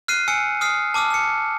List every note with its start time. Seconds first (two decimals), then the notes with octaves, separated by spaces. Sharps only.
0.08 F6 F#6 C7 D#7
0.28 G#5 E6 C#7
0.61 D#6 F6 C7
0.94 A5 D6 E6 F6
1.10 F6 C#7